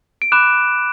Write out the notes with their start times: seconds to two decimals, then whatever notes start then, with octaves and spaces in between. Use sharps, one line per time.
0.22 D7
0.32 B5 D6 F#6 E7